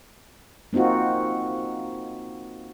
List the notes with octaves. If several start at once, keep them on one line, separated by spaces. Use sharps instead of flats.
A#3 C4 D#4 F4 F#4